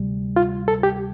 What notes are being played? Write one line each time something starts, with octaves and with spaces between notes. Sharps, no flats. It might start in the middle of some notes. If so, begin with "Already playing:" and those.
Already playing: D2 C3 G3
F4
A4
G4